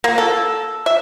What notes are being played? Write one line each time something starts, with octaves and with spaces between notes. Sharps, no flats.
A#3
A4
E5